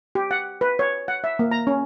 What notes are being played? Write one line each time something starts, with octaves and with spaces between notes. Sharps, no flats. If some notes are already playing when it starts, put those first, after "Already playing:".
G4
F#5
B4
C#5
F#5
E5
A#3
A#5
C#4